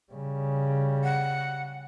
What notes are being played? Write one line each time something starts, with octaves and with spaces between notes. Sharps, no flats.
C#3 G3
F#5